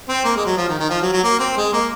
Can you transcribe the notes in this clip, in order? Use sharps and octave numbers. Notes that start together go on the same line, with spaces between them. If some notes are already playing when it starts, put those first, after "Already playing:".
C4
A#3
G#3
F#3
F3
D#3
D#3
F3
F#3
F#3
A#3
C4
G#3
A#3